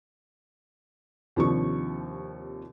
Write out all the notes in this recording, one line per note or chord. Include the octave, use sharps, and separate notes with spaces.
D#2 C3 F3 C4 D4 C#6